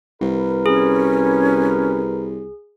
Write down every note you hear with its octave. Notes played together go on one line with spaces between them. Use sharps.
C2 A#4 B4
C#4 G#4